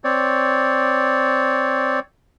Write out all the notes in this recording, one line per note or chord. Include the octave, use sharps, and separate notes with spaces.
C4 C#5 D5